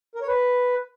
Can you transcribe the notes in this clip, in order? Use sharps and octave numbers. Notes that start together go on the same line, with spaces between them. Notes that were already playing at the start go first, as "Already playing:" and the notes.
A#4
C#5
B4